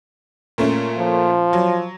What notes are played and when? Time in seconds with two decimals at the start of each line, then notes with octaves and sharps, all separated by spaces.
0.58 A#2 A3 C#4
0.97 F3
1.53 F#3